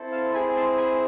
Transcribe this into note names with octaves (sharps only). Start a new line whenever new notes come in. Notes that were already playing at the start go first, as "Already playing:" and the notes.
Already playing: C4 E4 A4
F5 A5
C4 E4 G#4 G#5 B5
A5 C6
G#5 B5